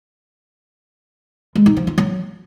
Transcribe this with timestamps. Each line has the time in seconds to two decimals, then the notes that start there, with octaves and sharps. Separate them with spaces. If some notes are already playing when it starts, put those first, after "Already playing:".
1.55 G#3
1.66 D#4
1.77 F3
1.87 F4
1.98 F#3